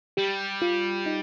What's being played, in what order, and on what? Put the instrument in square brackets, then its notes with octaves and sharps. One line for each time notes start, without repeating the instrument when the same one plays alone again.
[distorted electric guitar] G3 [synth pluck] G4
[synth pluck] F4
D#4